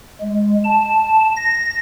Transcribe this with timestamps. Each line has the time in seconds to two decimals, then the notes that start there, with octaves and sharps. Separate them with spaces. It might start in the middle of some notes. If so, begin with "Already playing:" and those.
0.21 G#3
0.64 A5
1.36 A#6